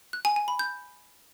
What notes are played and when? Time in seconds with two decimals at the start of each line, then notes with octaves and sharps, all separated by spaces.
0.13 F#6
0.25 G#5
0.36 G#5
0.48 B5
0.59 G6